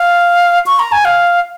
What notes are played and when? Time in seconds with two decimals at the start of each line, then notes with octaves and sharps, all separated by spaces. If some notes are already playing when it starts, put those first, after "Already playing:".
Already playing: F5
0.66 C#6
0.79 A#5
0.92 G#5
1.05 F5